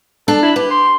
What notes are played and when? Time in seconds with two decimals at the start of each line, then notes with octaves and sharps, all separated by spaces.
0.28 D4 A4
0.43 E4
0.56 G4 B4
0.71 C6